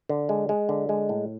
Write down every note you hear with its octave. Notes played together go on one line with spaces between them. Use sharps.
D3
G#3
G#3
D3
G#3
A2